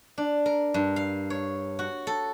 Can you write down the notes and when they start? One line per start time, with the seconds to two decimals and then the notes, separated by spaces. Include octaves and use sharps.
0.18 D4
0.46 A#4
0.74 G2
0.96 F5
1.30 C#5
1.79 F#4
2.07 A4